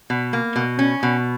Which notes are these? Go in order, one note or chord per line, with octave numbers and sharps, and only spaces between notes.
B2
A#3
B2
C#4
B2